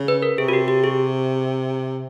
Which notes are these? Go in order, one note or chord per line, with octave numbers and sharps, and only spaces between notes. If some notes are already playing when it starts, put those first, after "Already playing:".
Already playing: C#3
B4
A#4
C3 G#4
F#4
G4
G4
G#4